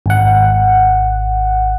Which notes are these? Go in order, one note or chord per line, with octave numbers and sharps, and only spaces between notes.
G#1 F#5